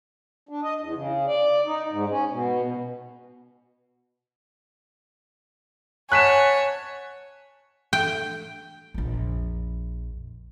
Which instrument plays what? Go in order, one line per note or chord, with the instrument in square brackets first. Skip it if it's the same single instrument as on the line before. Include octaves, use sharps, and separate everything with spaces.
[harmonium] D4
D#5
E2
C#3
D5
D#4
G#2
C#4
B2
B2
[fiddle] C#5 [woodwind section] F#5 A5 C#6 [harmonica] G#5 [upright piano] F#6 B6 E7
[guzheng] G5
[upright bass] A#1 F2